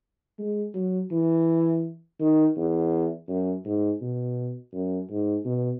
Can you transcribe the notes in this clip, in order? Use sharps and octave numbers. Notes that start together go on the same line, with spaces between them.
G#3
F#3
E3
D#3
E2
F#2
G#2
B2
F#2
G#2
B2